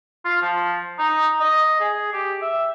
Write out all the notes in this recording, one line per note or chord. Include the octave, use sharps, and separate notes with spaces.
F4
F3
D#4
D#5
G#4
G4
E5